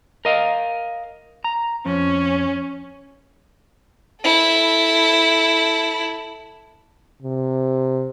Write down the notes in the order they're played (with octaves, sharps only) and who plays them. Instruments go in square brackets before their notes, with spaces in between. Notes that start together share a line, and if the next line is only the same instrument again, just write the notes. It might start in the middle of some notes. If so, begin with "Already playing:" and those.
[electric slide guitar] A#4 D#5 F5
A#5
[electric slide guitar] F2 [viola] C#4
[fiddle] E4 A4
[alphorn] C3